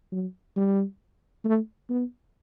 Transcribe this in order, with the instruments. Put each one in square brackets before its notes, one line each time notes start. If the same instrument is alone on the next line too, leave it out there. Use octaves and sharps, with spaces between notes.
[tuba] F#3
G3
A3
B3